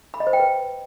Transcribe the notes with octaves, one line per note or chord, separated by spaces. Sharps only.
B5
D#5
C5
G5
B4